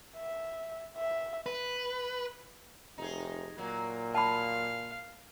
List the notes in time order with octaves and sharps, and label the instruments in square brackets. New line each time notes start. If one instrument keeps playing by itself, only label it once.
[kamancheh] E5
E5
[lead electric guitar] B4
[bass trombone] F1 [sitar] D#4 G#4
[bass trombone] A#2 [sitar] F#3 A#3
[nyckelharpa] F5 [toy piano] A5 B5